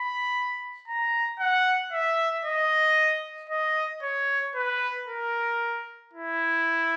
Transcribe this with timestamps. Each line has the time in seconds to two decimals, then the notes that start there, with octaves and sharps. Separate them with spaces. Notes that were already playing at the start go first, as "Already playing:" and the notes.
Already playing: B5
0.88 A#5
1.39 F#5
1.93 E5
2.45 D#5
3.50 D#5
4.03 C#5
4.55 B4
5.08 A#4
6.13 E4